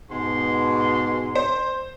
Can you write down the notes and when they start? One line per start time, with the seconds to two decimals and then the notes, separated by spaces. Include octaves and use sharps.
0.11 G#2 B2 C6
1.35 C5